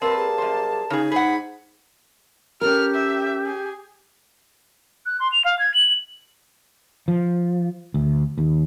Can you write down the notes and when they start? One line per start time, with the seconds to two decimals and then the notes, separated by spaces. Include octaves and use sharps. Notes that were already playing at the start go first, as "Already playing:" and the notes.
0.02 G3 A#3 C4 A#4 B4 A5
0.17 G#4
0.38 F#2 C5
0.90 C#3 D#4 G#4
1.12 G#2 G#4 F#5 B5
2.61 C#4 G4 A4 A#4 F6
2.95 E5
3.46 G#4
5.06 F#6
5.20 C6
5.32 F7
5.45 F5
5.59 G#6
5.74 F#7
7.08 F3
7.94 D2
8.38 D#2